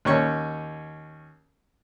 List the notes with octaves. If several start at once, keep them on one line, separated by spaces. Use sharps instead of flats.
D#2 C#4 C#6